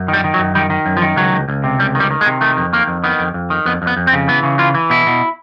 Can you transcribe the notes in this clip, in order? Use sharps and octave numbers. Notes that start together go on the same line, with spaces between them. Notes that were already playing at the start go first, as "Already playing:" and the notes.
Already playing: F#2
D#3
G3
D#3
F#3
F#2
D#3 G3
D#3
F#2
F3
D#3
C#2 F#3
C#2
C#2
C3
C#2 G3
D#3
G3
D#3
G#3
C3
D#3 A3
F2
D#3 A#3
F2
D#3 B3
F2
F2
D#3
F2 B3
F2
B3
F2
C4
C#3
E3 B3
C#3
E3 F4
E3
B2 E4
B2